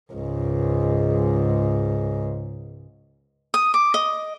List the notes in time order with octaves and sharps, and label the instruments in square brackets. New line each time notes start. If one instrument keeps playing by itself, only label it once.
[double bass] C#2 G#2
[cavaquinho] D#6
D6
D#5